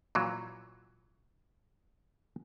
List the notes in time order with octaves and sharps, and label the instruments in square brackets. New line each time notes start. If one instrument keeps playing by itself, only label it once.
[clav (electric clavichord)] A#2 E3 F#3